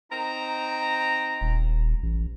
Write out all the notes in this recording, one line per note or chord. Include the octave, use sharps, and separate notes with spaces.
C4 D#4 A#5
D#1
A1